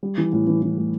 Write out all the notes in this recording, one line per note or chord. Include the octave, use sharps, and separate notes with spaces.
G3
E3
A2
E3
E3
A2